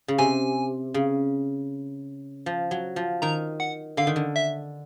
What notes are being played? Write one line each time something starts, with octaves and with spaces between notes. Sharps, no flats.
C#3
C3 G#5
C#3
F3
F#3
F3
D#3 A#5
F#5
D3 F5
D#3
D3
E5